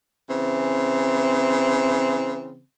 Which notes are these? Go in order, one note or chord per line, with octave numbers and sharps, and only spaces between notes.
C#3 E3 C4